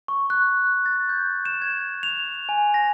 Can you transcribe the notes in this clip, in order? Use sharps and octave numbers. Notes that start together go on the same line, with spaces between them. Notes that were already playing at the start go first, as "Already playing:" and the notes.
C#6
F#6
A6
G6
E7
G#6
F7
G#5
A#6